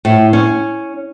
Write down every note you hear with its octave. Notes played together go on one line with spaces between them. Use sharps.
A2
C#4